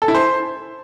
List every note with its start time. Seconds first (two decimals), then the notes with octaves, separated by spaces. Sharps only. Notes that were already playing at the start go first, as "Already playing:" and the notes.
0.02 A4
0.08 E4
0.15 C5